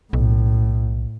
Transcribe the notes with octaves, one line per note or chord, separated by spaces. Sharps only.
B1 A2